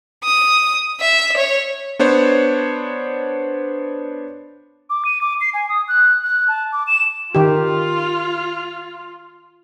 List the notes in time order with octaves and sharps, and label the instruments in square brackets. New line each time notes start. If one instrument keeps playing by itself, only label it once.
[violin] D#6
E5
C#5
[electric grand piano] B3 D4 C5 C#5
[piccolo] D6
D#7
D6
C7
G#5
D#6
F#6
F#6
A5
D6
E7
[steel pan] D#3 G4 [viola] F4